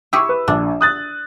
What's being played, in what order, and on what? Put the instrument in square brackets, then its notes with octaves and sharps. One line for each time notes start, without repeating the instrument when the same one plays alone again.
[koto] E4 G4 G#4 [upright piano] C#6 E6
[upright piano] B4
[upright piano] A#1 [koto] D4
[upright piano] D#6 F#6 A6